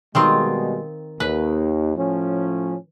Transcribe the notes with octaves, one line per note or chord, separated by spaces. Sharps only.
B2 D#3 G3 G#3 C4 F4
D#2 B4
A2 F3 C#4